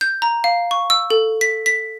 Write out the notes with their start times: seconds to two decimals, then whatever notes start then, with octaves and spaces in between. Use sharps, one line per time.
0.01 G6
0.22 A#5
0.44 F5
0.71 C#6
0.90 E6
1.10 A4
1.41 B6
1.66 B6